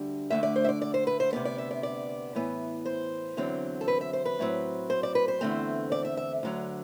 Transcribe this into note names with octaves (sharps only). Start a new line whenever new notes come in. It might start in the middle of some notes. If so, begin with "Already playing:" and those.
Already playing: D2 D3 G3
D2 D3 A3 E5
D5
C5
E5
D5
D5
C5
B4
C5
D2 C3 F#3 B3 D5
D5
E5
D5
D5
A2 E3 B3
C5
E2 D3 F#3 C4
A4
B4
E5
C5
B4
A2 F#3 C4
C5
D5
B4
C5
E2 D3 A3 C4
D5
E5
E5
D2 D3 F#3